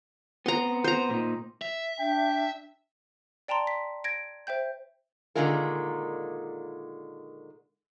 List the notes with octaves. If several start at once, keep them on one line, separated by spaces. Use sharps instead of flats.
B3 C4 A#5 C6
C5 A#5
A#2 D#4
E5
D4 G5
D5 G5 A5 A#5 C6
B6
G#6 A#6 D7
C5 E5 G5 G6
A#2 D3 D#3 G#3 F4 A#4